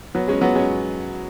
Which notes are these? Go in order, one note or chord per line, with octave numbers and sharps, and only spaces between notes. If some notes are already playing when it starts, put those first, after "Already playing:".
F#3 B3
G#3 C#4
F#3 B3
G#3 C#4